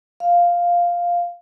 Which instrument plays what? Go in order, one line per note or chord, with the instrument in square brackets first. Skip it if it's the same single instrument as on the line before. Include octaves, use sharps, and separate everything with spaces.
[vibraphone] F5